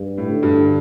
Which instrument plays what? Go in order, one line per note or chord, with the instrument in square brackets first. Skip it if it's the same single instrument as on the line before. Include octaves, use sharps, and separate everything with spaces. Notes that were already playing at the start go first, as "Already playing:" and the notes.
Already playing: [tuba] G2
[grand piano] A2
[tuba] D3
[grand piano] G2